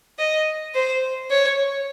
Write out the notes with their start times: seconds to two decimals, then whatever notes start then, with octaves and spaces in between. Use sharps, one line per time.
0.19 D#5
0.75 C5
1.31 C#5